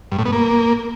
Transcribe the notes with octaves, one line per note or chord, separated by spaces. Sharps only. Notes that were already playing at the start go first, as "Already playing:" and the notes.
G2
A2
B3
A#3